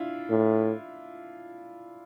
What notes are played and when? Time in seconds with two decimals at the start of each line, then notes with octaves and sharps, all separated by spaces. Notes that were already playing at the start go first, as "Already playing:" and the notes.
Already playing: D4 E4 F4
0.30 A2